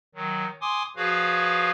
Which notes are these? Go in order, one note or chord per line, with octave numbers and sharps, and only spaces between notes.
D#3 F#3
G#5 C6 D6 D#6
F3 F#4 G#4 B4 C#5 F5